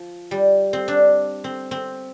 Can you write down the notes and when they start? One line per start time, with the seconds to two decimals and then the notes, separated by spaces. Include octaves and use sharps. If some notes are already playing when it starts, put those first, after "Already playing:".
Already playing: F3
0.31 G3
0.73 C4
0.88 D4
1.44 C4
1.71 C4